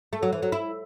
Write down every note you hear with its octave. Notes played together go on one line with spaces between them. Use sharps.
A3
F#3
E3
F#3
E4